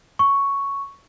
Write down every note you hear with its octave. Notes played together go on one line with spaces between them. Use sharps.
C#6